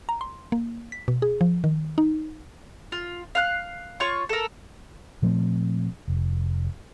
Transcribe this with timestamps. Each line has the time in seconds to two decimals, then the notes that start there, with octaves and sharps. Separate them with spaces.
0.09 A#5
0.21 C6
0.52 A#3
0.92 B6
1.08 B2
1.22 G#4
1.41 F3
1.64 D#3
1.98 D#4
2.92 F4
3.35 F5 F#6
4.00 F4 C#5 C#6
4.29 A4 A#4
5.22 A#2 F3 A3 C4
6.08 F1